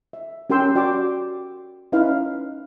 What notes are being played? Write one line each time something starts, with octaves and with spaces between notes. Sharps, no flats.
E5
C#4 G4 A#4 G5 C6 E6
F#4 D5 G5 C6 D6
C#4 D#4 E4 B4 F5